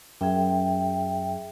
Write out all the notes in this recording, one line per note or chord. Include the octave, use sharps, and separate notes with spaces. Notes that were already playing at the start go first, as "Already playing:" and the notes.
F#2 G#4 E5 G5